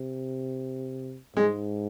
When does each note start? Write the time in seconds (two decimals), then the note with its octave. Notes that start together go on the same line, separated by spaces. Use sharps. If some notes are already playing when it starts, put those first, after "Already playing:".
Already playing: C3
1.36 G#2 G#3